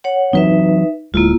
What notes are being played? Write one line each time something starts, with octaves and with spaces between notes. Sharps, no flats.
C#5 F#5
E3 F#3 C4 D#4 B4 E5
D1 G#3 A#3 E4 F4